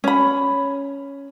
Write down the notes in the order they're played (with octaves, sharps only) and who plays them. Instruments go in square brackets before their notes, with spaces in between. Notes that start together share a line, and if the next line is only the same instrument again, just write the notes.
[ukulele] C#4 B5